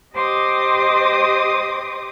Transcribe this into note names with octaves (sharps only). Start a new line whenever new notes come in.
G4 C5 D#5 C6 D6 D#6